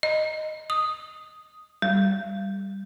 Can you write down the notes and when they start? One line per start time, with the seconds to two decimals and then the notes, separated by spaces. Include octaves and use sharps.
0.03 D#5
0.70 D#6
1.82 G3